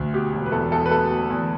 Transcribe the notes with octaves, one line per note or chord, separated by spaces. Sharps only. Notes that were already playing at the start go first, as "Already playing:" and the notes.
Already playing: D2
B2 G4
E1
B4
E2 A4
E2 A4
B4
B2 A4
B2
E2